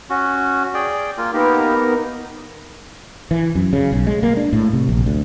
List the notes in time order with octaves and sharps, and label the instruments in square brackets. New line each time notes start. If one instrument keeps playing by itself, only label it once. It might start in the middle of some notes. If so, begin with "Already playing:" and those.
[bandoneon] C#4 F#4
G#4 D5 G5
A#3 F4
[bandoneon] A#3 G4 [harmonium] B3 D#4 A#4
[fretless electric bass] E3
F#2
C#3
B1
G#3
A#3
D4
A2
C3
A#1
D2